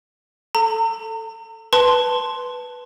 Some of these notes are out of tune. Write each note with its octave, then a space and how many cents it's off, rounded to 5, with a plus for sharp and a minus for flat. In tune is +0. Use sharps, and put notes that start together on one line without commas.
A4 +0 A#5 -40
B4 +0 A5 +0 C6 +0